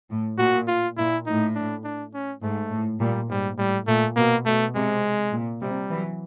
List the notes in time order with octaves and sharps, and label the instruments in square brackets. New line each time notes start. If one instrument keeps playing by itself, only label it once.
[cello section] A2
[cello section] A#2 [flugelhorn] F#4
[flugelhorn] F4
[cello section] A#2 [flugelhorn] E4
[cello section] A2 [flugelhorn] D#4
[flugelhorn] D4
D4
C#4
[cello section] G#2 [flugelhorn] A3
[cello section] A2
[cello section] A#2 [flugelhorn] G3
[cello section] G#2 [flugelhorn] G3
[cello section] A2 [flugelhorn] G3
[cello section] A#2 [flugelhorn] A3
[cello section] B2 [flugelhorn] A#3
[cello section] B2 [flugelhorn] A3
[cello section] C3 [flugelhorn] G#3
[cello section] A#2
[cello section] C3 [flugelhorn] G3
[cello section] E3 F#3